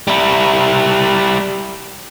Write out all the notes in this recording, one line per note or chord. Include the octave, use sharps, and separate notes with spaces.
G3 E4